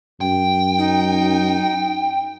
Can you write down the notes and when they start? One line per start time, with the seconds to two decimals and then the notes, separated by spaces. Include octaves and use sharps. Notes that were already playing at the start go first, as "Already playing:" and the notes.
0.21 F#2 G5
0.78 D#4